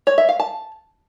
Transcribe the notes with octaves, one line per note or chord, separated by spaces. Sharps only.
C#5
E5
F5
A5